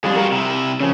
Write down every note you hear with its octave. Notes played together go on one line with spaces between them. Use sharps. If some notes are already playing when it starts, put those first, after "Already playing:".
F2 G3 D4 F4 G#4
C4 F#4 A#4
C3 E4
C#3 F3 C#4